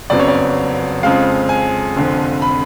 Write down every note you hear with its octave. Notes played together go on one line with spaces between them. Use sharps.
F#1 F2 C#3 F#3 B3 D5
C#5
D5
F2 C#3 F3 G#3 F5
G#5
F1 F2 D3 F3
B5